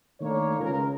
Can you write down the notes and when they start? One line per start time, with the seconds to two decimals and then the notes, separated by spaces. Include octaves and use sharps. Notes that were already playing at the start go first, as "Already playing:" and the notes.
0.21 D#3 A3 A#3 D4 C#5
0.59 C#2 A#4